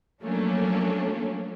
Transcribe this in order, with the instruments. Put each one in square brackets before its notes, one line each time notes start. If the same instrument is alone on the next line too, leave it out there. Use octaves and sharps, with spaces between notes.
[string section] F3 F#3 A3 A#3 C#4 D4